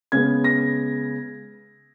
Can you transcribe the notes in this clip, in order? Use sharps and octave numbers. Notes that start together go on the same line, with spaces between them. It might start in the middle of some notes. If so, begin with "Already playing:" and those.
C#3 G#3 B3 G#6
A#6